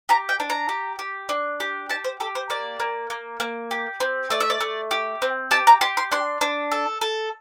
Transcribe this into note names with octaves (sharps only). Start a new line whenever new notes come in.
G4 A#5
G5
D4
A#5
G4
G4
D4
G4
G4 A5
C5
G4 A4
C5
A#3 D5
A#3
A#3
A#3
G4
C4
A3 D5
E5
D5
A3
G4
C4
G4 A5
A#5
G4 C6
C6
D4 C6
D4
A4
A4